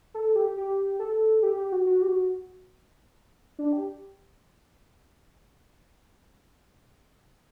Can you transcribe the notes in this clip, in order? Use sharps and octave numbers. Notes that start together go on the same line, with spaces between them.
A4
G4
G4
A4
G4
G4
F#4
F#4
G4
F#4
D4
G4